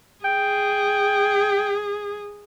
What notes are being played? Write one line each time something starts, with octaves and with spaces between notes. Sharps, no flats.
G#4 G5